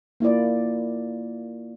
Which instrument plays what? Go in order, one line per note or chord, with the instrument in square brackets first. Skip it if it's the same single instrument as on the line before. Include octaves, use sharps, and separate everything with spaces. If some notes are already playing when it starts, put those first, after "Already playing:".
[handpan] A#3 E4 F4 D5